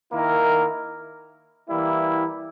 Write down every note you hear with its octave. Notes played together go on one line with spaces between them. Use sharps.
D#3 A#3 E4 A#4
E3 G3 A#3 E4